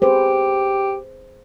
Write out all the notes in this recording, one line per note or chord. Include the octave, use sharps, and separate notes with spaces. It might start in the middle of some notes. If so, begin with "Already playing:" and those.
G4 G#4 B4 C5